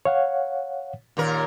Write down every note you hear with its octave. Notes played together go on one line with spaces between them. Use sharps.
C#5 F5 F#5
D#2 A#2 A#4